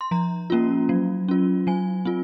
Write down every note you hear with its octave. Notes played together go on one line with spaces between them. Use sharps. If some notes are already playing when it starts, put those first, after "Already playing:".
C6
F3 A#5
A#3 C#4 F4
F#3
C#4 F4
F#3 G#5
C4 F4